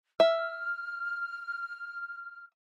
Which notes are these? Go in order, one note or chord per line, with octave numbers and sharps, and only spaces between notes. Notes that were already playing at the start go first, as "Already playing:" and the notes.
E5 F6